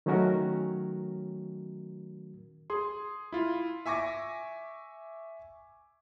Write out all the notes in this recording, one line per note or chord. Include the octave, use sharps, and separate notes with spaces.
D#3 F#3 A3 C#4 F#4 A#4
G#4 C6
E4 F4
E5 G#5 C#6 D6 A#6